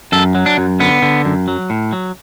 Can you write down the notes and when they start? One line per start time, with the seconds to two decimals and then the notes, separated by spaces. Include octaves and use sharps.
0.12 F#2 A4
0.35 F#3
0.46 D4
0.58 F#2
0.80 D3 B3
1.02 D3
1.25 F#2
1.48 F#3
1.70 A2
1.93 F#3